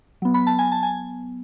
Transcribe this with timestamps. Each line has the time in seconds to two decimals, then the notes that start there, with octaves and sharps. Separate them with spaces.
0.22 F#3 B3
0.34 B5
0.47 A5
0.59 G#5
0.72 A5
0.83 G#5